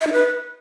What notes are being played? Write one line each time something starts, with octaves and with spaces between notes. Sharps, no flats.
E5
D#4
B4